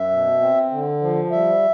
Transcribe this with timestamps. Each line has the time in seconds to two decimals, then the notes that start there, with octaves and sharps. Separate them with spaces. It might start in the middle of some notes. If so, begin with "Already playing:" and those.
Already playing: F#2 E5
0.11 B2
0.41 C4
0.71 D3
1.01 F3
1.31 G3 E5